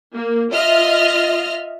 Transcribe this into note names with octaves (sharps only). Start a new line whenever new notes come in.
A#3
F4 D#5 E5 F6